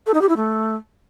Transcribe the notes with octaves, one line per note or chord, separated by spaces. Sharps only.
A4
D#4
G4
E4
A3